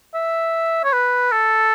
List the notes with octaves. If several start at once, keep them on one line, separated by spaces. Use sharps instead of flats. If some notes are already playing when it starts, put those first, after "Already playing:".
E5
C#5
B4
A4